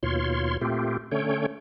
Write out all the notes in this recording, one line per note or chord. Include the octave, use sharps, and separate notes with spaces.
D#2 B2 F4 C#5 C6
A#2 A3 C4 F4 G4
D3 A3 C#4 C#5 G5